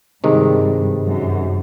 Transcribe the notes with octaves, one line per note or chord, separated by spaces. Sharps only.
G2 C3 D#3 G#3
F#2